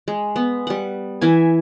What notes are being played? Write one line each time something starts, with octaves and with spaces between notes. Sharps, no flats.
G#3
B3
G3 F#5
E3 E5 G#5